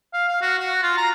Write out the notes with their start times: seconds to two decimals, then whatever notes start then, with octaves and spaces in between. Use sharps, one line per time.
0.13 F5
0.28 F5
0.41 F#4
0.59 F#4
0.83 F4
0.97 A#5